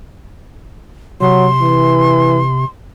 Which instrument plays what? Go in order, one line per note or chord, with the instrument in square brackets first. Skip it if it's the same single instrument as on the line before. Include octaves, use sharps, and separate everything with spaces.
[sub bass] C3 [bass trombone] F#3 [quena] C6
[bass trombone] E3